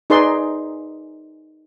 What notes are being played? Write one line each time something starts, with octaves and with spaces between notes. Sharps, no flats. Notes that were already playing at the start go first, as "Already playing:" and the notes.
D#4 G#4 B4 D5 C6